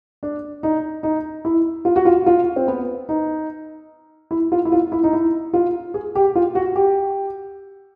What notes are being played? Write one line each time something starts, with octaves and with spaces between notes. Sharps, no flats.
D4
D#4
D#4
E4
F4
F#4
F4
F4
C4
B3
D#4
E4
F4
E4
F4
E4
D#4
E4
F4
G#4
G4
F4
F#4
G4